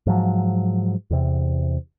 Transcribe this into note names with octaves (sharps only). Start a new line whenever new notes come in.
G#2 F3 F#3
E2 C3